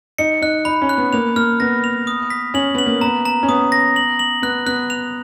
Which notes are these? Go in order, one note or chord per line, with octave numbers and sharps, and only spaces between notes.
D#4 C#7
D#4 F#6
D#4 B5
C#4
F#6
B3
A#3 F7
A#3 F6
B3 A#6
F7
D#6
B6
C#4 F#7
B3 F#7
A#3
B3 A#5
A#5
C#4
B3 D#6
A#6
F#7
F#7
B3 F#6
B3 F#6
F7